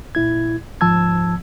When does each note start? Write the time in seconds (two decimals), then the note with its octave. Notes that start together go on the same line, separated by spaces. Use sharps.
0.15 A#2 E4 G#6
0.81 D2 G#2 F3 A5 E6 G#6